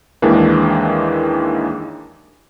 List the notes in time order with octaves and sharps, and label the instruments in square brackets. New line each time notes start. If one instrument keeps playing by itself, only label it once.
[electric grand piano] D#2 D#3 E3 G#3 A#3 D4